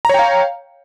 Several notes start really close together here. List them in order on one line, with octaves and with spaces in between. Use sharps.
A#5 C#5 G5 F5